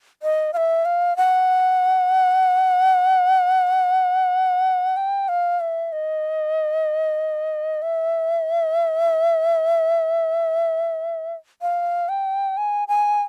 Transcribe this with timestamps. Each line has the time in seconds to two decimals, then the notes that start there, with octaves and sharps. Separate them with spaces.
0.23 D#5
0.53 F5
0.57 E5
0.85 F5
1.17 F#5
4.97 G5
5.28 F5
5.60 E5
5.92 D#5
7.82 E5
11.62 F5
12.09 G5
12.57 G#5
12.88 G#5